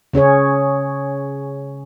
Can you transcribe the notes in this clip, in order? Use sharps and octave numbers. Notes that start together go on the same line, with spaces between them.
C#3 C#4 G#4 C#5